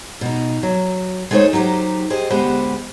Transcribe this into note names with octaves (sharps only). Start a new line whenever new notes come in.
B2 D#4
F#3
G#3 A3 D#4 G#4 C5 C#5
F#3 D#4 G4 C5
G4 G#4 C5 D#5
D2 G#3 B3 G4 C5 F#5